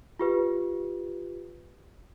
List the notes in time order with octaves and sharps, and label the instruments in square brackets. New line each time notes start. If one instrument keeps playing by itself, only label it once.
[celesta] F4 G4 B4